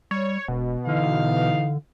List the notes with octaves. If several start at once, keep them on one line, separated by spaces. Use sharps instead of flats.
G3 C#5
E1 B2
D3 E3 D#4 F5